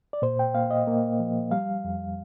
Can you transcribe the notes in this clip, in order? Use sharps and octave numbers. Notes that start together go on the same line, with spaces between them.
D5
A#2 C5
G5
A#3 F5
D#5
A#3
F3
G3 F5
F2